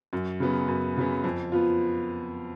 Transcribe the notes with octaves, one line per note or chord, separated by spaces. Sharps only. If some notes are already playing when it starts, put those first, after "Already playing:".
F#2
C#3 F#3 B3
F#2
C#3 F#3 B3
F2
F3 B3 F4